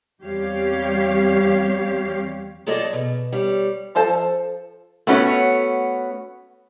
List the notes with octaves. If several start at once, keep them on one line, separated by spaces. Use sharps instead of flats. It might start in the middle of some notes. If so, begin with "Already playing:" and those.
E2 G3 C4 G4 C#5 F5
F#3 F4 G#4 A4 D5 D#5
B2
G3 C#5
F3 A4 C5 A5
A3 B3 C#4 F#4 C#5